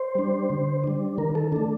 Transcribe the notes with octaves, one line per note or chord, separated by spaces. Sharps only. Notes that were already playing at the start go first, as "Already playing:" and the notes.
Already playing: C5
G3 D4
D3
G3 D4
D#3 A#4
A4
A3 D4 A4